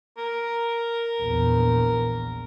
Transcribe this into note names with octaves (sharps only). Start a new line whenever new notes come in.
A#4
A#1 E2